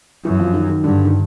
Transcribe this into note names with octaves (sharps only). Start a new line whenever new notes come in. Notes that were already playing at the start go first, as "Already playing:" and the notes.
F#2 E3
F3
D#3
D#3
G2 D3
D#3